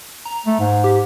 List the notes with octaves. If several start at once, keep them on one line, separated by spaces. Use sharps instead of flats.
A#5
A3
G#2
G4